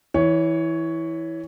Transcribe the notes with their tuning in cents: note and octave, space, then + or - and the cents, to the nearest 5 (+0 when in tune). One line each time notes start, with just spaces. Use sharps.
E3 -10 C#5 +10